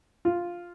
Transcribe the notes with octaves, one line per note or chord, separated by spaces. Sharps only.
F4